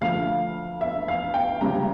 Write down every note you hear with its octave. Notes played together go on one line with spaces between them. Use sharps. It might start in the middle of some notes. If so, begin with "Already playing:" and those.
D2 D3 F3 A3 F5
E5
F5
G5
C#2 C#3 G3 A#5